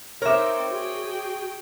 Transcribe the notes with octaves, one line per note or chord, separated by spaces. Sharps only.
C4 D#4 A#4 C#5 E5 D6
F#4 G#4 G5